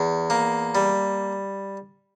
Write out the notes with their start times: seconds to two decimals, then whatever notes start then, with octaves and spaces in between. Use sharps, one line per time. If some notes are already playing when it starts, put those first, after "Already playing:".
Already playing: E2
0.30 A#3
0.75 G3